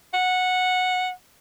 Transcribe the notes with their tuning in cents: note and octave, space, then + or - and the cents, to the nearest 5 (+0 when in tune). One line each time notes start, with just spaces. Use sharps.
F#5 -10